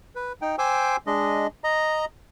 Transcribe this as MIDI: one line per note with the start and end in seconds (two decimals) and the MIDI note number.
0.15 0.33 71
0.42 0.56 63
0.42 0.56 79
0.59 0.97 72
0.59 0.97 79
0.59 0.97 80
0.59 0.97 84
0.59 0.97 86
0.59 0.97 88
1.07 1.47 56
1.07 1.47 62
1.07 1.47 75
1.64 2.05 75
1.64 2.05 82